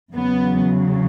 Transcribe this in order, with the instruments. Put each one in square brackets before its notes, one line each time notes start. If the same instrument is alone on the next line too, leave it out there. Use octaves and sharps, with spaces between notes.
[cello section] E2 C#3 F#3 B3